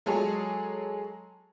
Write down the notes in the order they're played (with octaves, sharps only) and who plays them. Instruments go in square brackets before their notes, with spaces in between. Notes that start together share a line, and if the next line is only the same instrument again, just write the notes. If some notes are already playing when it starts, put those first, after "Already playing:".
[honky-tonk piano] F#3 G#3 G#4 A4 C#5